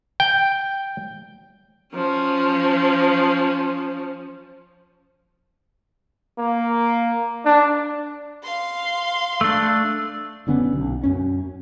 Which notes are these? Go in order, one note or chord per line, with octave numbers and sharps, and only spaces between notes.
G5
F3 C#4
A#3
D4
F5 C6
A3 D4 E6
F#1 D3 B3 C#4
B1
F#2 C#4